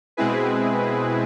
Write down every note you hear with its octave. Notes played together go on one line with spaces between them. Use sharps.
B2 G#3 C4 E4 G#4 B4